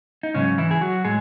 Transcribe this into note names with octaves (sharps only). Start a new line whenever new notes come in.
D#4
G#2 C#3 F#3 C#4
E3 E4
G#4
F#3 F#4
A2 G#3 G#4